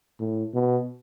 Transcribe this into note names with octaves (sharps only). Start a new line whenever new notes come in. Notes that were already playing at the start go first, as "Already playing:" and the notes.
A2
B2